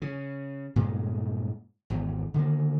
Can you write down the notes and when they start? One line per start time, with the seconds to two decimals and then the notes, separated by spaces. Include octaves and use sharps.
0.02 C#3
0.76 G2 A#2 C#3 G#3
1.90 G#1 E2
2.34 D3 D#3 A3 A#3